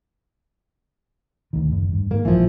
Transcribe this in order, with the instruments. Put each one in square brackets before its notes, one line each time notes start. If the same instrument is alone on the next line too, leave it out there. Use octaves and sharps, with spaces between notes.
[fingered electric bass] D#1 D2 D#3
F#1
G2
[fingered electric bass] G#2 [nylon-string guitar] A#3
[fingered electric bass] A#1 [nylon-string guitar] E3 F3